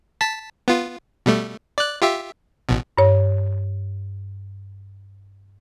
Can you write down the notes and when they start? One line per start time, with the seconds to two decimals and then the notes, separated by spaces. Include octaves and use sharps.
0.21 A5 B6
0.68 B3 F4
1.26 B2 G3 A3
1.78 D5 F#6
2.02 F4 G4 E5
2.69 A1 B2
2.98 G2 C#5